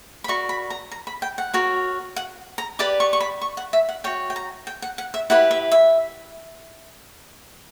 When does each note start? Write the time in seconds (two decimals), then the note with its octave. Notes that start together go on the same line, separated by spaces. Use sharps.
0.24 B5
0.28 F#4 A#4 D5 C#6
0.49 B5
0.70 A#5
0.92 A#5
1.07 B5
1.22 G5
1.38 F#5
1.54 F#4 A#4 C#5
2.16 F#5
2.58 A#5
2.79 G4 B4 D5 D6
3.00 C#6
3.13 C#6
3.20 B5
3.41 C#6
3.57 F#5
3.73 E5
3.89 F#5
4.04 F#4 C#5 G5
4.30 G5
4.36 A#5
4.67 G5
4.82 F#5
4.98 F#5
5.14 E5
5.30 E4 G4 B4 F#5
5.51 E5
5.72 E5